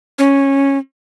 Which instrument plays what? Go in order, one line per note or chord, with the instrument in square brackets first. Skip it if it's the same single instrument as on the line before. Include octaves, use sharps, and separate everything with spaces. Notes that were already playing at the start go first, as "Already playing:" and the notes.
[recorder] C#4